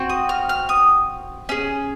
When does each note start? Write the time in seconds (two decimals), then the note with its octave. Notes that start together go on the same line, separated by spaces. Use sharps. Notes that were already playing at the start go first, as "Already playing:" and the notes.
Already playing: C4 F#4
0.09 D#6
0.29 F6
0.49 F6
0.69 D#6
1.49 C#4 G#4